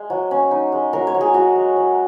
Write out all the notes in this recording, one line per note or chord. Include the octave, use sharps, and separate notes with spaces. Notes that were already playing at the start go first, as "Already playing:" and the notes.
Already playing: G#3
F#3
C#4
D#4
G#3
F#3 A#4
C#5
F#3
G#4
G#3 F#4
G#3
F#3